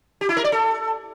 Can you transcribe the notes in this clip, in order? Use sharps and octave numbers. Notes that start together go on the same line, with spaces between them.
G4
E4
A#4
D5
A4